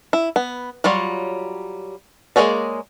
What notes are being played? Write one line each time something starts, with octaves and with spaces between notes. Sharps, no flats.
E4
B3
F#3 G3 F4 C#5
G#3 A#3 G#4 C#5 D5